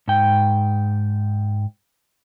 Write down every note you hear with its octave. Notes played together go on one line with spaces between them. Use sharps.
G#2 G5